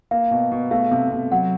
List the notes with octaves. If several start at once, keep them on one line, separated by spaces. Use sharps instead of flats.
A#3 F5
B2
B2
A3 F5
C3
C3
F#3 F#5